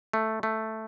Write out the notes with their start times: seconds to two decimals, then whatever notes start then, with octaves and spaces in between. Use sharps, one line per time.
0.13 A3
0.43 A3